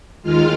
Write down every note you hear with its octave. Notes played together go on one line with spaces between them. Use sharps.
D#2 D#3 G#3 F4 F5